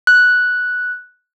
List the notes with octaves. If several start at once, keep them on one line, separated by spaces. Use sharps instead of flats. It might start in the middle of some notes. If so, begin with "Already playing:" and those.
F#6